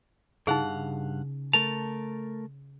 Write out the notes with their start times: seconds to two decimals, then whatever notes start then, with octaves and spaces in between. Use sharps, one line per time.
0.47 G2 C#3 D#4 G#4 F5 F#5
1.53 A3 A#4 A5 F7